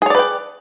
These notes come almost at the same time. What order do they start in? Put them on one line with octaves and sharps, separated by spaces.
G#4 C#5 D5 B4 G5